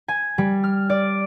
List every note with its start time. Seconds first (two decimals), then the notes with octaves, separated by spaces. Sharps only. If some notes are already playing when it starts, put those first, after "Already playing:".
0.08 G#5
0.38 G3
0.64 F6
0.90 D5